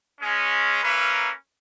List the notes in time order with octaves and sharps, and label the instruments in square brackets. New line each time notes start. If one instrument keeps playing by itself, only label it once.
[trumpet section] G#3 C#4
A#3 C#4 A#4 B4 E5